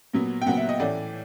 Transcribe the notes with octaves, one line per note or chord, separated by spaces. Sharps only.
A#2 F#3 B3
G5
A#2 F#3 B3 F#5
E5
D#5
A2 E3 A3 C#4 D5